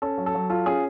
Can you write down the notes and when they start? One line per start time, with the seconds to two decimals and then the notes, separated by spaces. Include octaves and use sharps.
0.02 C#4 A4
0.18 F#3
0.26 A4
0.35 F#3
0.50 F4 A4
0.66 C#4 G#4